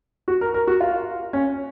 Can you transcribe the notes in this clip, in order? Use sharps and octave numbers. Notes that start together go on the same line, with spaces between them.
F#4
A#4
A#4
F#4
F4
C#4